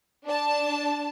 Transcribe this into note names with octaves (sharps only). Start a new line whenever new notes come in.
D4 A5